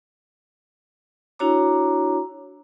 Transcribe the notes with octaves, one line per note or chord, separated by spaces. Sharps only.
D4 E4 F#4 C#5 A#5 D6